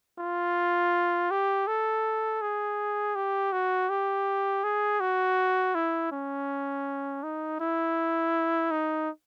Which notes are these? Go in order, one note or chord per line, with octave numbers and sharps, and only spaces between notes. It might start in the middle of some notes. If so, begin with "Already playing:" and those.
F4
G4
A4
G#4
G4
F#4
G4
G#4
F#4
E4
C#4
D#4
E4
D#4